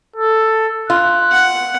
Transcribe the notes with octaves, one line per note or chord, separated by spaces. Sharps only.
A4
F4 F#6
F#5